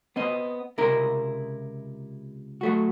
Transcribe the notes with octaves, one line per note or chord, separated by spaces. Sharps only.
B3 C4 D#5
C#2 C3 E4 A#4
F#3 A3 F#4